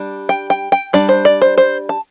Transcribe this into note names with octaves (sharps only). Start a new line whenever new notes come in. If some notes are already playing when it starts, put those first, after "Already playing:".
Already playing: G3 D4
G5
G5
G5
G3 D4 D5
C5
D5
C5
C5
A5